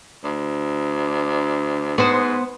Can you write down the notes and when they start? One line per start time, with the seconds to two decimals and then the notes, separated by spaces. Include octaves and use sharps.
0.24 D2
1.98 G#2 B3 C5